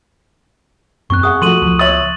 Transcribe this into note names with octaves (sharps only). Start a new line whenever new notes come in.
F#2 C4 C#6 F#6
G#4 F#5 D#6
F3 A3 F#4 C6 D#7 F#7
C#2 F3
C#5 E5 D#6 A6 F#7